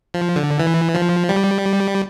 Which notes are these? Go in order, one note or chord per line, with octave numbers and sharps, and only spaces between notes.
F3
D3
E3
F3
G3